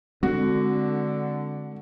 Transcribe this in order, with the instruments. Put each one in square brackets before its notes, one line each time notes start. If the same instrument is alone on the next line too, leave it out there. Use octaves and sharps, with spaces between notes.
[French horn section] D3 [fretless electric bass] G#3 C4 [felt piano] F#4